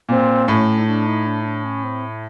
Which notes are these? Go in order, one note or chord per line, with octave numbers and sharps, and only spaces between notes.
A#2 C4
A2 C#4
D#4
D4
D#4
D4
D#4
D4
C#4
C4